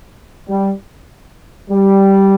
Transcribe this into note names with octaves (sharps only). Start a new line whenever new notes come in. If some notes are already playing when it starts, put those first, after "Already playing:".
G3
G3